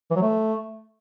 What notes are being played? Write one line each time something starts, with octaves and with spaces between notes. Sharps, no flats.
E3
F#3
A3